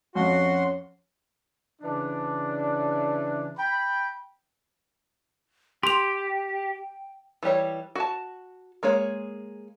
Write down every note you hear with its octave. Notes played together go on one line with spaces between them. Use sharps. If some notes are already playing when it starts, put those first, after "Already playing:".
F2 C#4 F#4 C#5 C6
C#3 E3 D4
G5 B5
G4 G5 C6 F7
E3 G3 G4 C#5
F#4 A5
G#3 A#3 G#4 C#5